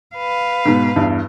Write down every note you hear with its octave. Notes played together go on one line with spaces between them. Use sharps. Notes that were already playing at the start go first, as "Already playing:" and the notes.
B4 F5
G#2 B2
E2 G2